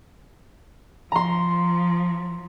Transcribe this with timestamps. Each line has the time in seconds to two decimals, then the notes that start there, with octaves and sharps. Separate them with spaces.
1.12 F3 A#5 C6